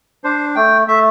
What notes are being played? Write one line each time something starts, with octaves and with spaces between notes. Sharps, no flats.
D4 C5
A3 G5
A3 E5